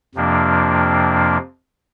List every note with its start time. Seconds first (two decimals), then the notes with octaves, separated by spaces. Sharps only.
0.15 F2 C3 F3 A#3 D4